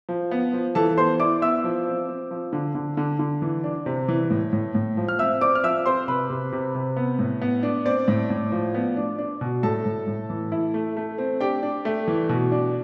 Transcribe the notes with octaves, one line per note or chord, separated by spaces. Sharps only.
F3
B3
F3
E3 A4 A5
B3 C5 C6
E4 D5 D6
B3 E5 E6
F3
C4
C4
F3
D3
D3
D3
D3
E3
D4
C3
E3
A2
A2
A2
F3
F6
C4 E5 E6
C4 D5 D6
F6
F3 E5 E6
C4 C5 C6
C3 B4 B5
C3
C3
C3
B3
A2
B3
D4
C4 D5
A2
A2
F3
B3
D4
D4
B2
A2 A4 A5
A2
A2
E3
E4
A3
A3
C4
D4 G4 G5
D4
A3
E3
B2
D4